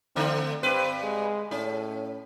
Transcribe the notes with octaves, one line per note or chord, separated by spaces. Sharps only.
D3 A3 C4 D4
G2 C4 B4
G#3
A2 C#4